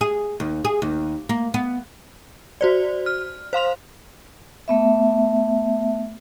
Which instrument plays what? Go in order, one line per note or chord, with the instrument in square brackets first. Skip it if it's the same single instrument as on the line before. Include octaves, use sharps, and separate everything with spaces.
[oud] G#4
D#2
G#4
D#2
A#3
B3
[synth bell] F#4 C5 D5
F6
C5 F5 C6 F7
[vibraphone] A3 B3 E5